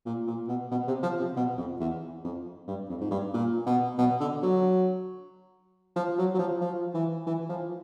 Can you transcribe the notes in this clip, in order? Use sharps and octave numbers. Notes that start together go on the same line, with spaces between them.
A#2
A#2
B2
B2
C3
F3
C3
B2
F2
E2
F2
G2
F2
G#2
G2
A#2
B2
B2
D3
F#3
F3
F#3
F#3
F3
F3
E3
E3
F3